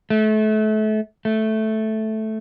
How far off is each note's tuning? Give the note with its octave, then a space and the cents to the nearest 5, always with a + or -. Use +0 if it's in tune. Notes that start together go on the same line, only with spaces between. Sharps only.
A3 -30
A3 -5